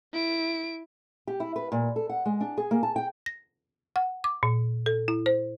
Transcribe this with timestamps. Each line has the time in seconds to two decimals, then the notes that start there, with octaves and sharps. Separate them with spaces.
0.13 E4 D7
1.27 G4
1.40 E4
1.56 B4
1.72 A#2
1.96 A4
2.10 F#5
2.26 G#3
2.41 D4
2.58 G#4
2.71 A#3
2.83 A5
2.96 G5
3.26 A#6
3.96 F#5
4.24 D6
4.43 A#2
4.86 A4
5.08 E4
5.26 C5